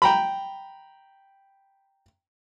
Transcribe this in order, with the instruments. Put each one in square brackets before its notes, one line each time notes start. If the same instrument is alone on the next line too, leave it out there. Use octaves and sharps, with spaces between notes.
[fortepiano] G5 A#5 B5